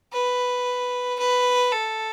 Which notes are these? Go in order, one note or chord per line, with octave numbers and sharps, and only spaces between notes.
B4
B4
A4